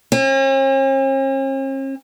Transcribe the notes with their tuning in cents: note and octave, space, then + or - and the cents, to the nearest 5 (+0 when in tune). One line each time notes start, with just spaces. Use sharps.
C#4 -45